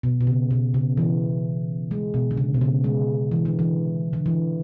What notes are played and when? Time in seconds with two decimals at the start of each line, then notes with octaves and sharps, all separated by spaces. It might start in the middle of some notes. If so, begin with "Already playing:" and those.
0.03 B2
0.21 B2
0.27 C#3
0.51 B2
0.74 C#3
0.97 E3
1.91 G#3
2.14 B2
2.31 D3
2.37 C#3
2.54 B2
2.61 C#3
2.84 G#3
3.32 E3
3.45 D3
3.59 E3
4.13 D3
4.26 E3